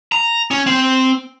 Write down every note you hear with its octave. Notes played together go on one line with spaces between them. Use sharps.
A#5
C#4
C4